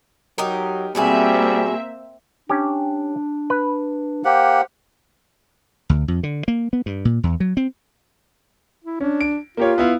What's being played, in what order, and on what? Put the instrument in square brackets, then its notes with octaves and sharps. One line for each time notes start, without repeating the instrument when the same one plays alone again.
[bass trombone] F#3 [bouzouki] D#4 G4 A#4
[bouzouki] B2 F#4 G#4 [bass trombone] G3 [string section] A#3 C4 E5
[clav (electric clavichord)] C#4 G4 [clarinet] D4
[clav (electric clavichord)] B4
[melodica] A#3 G4 F#5 [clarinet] C5
[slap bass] D2
F2
D3
A#3
B3
G2
A#2
E2
F#3
C4
[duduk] E4
[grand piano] C#4 [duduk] D4
[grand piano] D7
[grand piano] A#3 G4 C#5 [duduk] F4
[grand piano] B3 E4 F5